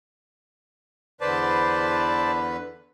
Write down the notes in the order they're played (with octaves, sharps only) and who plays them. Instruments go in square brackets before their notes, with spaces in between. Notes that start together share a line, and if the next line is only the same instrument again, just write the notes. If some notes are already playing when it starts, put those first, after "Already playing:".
[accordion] E2 D3 B4 [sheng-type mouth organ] C5 D5 A5